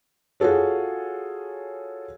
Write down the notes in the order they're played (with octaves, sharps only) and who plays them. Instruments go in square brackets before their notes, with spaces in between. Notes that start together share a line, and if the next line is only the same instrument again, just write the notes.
[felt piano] F4 F#4 G#4 A4 C#5